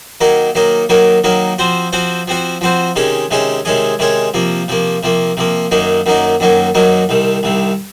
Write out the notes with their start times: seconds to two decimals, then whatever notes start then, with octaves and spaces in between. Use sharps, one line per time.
0.21 D#3 F#3 A#3 D#4 A#4
0.55 D#3 F#3 A#3 D#4 A#4
0.89 D#3 F#3 A#3 D#4 A#4
1.24 D#3 F#3 A#3 D#4 A#4
1.59 F3 C4 F#4 C5
1.93 F3 C4 F#4 C5
2.28 F3 C4 F#4 C5
2.61 F3 C4 F#4 C5
2.96 C3 D#3 G#3 C#4 G#4
3.31 C3 D#3 G#3 C#4 G#4
3.65 C3 D#3 G#3 C#4 G#4
3.99 C3 D#3 G#3 C#4 G#4
4.34 C3 F3 A#3
4.68 C3 F3 A#3
5.03 C3 F3 A#3
5.37 C3 F3 A#3
5.71 F#2 D#3 F#3 A#3 D#4
6.06 F#2 D#3 F#3 A#3 D#4
6.40 F#2 D#3 F#3 A#3 D#4
6.75 F#2 D#3 F#3 A#3 D#4
7.09 C2 C3 D#3
7.43 C2 C3 D#3